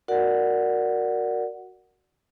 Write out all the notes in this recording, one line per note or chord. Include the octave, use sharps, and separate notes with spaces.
F#4 A#4 D5 F#5